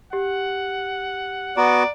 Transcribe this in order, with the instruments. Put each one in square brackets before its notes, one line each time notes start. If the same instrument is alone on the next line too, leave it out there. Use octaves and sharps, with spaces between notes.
[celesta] G4 [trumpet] F#5
[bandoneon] B3 F#4 [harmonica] D5 [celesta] A#5